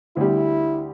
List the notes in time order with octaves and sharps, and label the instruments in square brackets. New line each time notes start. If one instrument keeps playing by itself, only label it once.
[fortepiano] D2 G3 [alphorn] E4